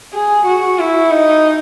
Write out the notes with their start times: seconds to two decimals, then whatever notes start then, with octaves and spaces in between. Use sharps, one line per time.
0.13 G#4
0.46 F#4
0.79 E4
1.12 D#4